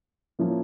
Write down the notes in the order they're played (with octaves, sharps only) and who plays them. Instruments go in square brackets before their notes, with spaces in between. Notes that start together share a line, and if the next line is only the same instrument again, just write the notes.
[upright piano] F3 A#3 C#4 E4